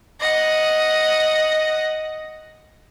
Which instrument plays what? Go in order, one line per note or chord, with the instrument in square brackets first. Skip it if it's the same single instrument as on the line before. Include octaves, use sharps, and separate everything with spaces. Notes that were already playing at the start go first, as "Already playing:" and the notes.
[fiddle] D#5 F#5